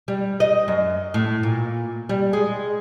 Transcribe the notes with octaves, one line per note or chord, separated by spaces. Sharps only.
G3
D#5
F#2
A2
A#2
G3
G#3